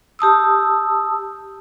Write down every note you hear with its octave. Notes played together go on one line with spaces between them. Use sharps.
G4 A5 D#6 E6